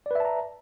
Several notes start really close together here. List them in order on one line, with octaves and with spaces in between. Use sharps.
D5 B4 E5 A5 A#5